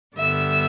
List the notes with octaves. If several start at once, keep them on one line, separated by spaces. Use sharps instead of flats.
G2 D3 G3 B3 E5